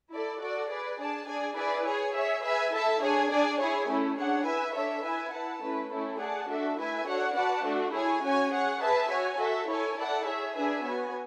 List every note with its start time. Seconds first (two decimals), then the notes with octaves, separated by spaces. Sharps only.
0.11 E4 A4 D5
0.39 F#4 A4 D5
0.68 G#4 B4 D5
0.98 D4 G#4 D5 A5
1.27 D4 G#4 D5 G#5
1.55 E4 G#4 B4 D5 G#5
1.84 G#4 C#5 G#5
2.13 G#4 C#5 E5
2.43 G#4 B4 E5 G#5
2.72 E4 A4 E5 A5
3.01 D4 G#4 C#5 G#5
3.29 D4 G#4 D5 G#5
3.59 E4 G#4 C#5 G#5
3.88 A3 C#4 E4
4.17 D4 G#4 C#5 F#5
4.45 E4 B4 E5 G#5
4.75 D4 A4 C#5 E5
5.03 E4 B4 E5 G#5
5.32 E4 B4 F#5 A5
5.61 A3 C#4 E4 B4
5.91 A3 C#4 E4 A4
6.19 G#4 D5 F#5 A5
6.49 A3 D4 F#4 A4 E5
6.78 A3 E4 B4 E5 G#5
7.06 D4 F#4 A4 C#5 F#5
7.36 F#4 B4 D5 F#5 A5
7.64 A3 D4 F#4 A4
7.94 E4 G#4 C#5 G#5
8.23 C#4 F#4 C#5 G#5
8.52 G#4 C#5 F#5
8.80 G#4 B4 E5 A5
9.10 F#4 C#5 G#5
9.39 F#4 A4 E5
9.68 E4 A4 C#5 G#5
9.96 E4 A4 D5 F#5 A5
10.25 G#4 C#5 E5
10.54 D4 G#4 B4 E5 G#5
10.84 B3 F#4 C#5 G#5